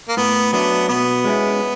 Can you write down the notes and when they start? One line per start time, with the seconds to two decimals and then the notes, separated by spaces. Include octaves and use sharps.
0.08 A#3
0.17 A2 B3
0.53 F#3 A3 B3 D4
0.88 B2 B3
1.24 G#3 C#4 E4